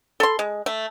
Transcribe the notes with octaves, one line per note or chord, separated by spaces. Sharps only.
A4 C6
G#3
A3